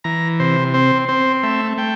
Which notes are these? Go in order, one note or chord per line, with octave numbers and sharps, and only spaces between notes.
E3 A#5
C3 C5
C4 C5
C4 C5
A3 E5
A3 G5